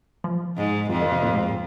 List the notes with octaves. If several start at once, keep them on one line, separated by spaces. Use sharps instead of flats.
F3
G#2
F2 F3
D#3
C3
A#2
G#2